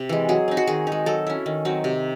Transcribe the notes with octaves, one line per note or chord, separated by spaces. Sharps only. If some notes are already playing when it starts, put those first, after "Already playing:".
Already playing: C3
E3 G#3
F#3 G#4
C4 D#4
F#4
D#3 G#4
D#4
G#3
F#3 A4
C#4 E4
D#3
F#3 C4 D#4
C3